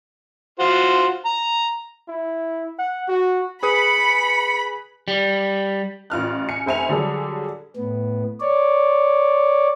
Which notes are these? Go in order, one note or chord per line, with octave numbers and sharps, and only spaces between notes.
F4 F#4 C5
A#5
E4
F#5
F#4
G#4 B4 B5 D#6 C#7
G3
A1 F4 F6 F#6
G#5 C#7
F1 C5 E5 G#5 C#7 F7
D3 F#3 G3 G#4 A4
A2 B3
C#5 D5